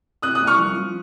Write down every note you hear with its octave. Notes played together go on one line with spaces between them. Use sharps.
C3 D#6 F#6
D#6 F#6
C2
C#6 F6
F3
F3